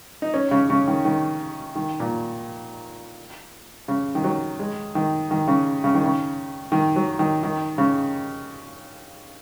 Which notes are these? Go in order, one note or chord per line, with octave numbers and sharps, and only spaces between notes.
D#4
C#4
C#3
C#3
D#3
D#3
D#3
A#2
C#3
D#3
F#3
G#3
D#3
D#3
C#3
C#3
D#3
C#3
D#3
F#3
D#3
D#3
C#3